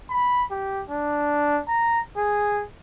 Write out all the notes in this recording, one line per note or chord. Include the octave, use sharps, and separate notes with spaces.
B5
G4
D4
A#5
G#4